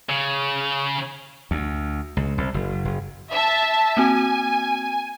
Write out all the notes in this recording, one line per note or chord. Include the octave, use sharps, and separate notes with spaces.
C#3
D2
C#2
C2
F#1
F#1
E5 A5
A#3 C4 F#4 G#5